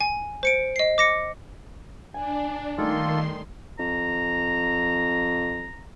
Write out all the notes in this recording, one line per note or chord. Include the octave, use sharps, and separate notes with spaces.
G#5
C5 C#7 D7
D#5 C7
D6 A#6 C#7
D4 G#5
D#3 G3 A3 A#3 D#4 F4 A4 C6
F2 A#5